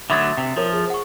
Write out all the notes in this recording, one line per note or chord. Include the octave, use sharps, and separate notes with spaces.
D3 F#3 A3 E5 B5 C#6 D#6 A6
C3
F3 A#4 C#5
G#4 C5
F#5 C#6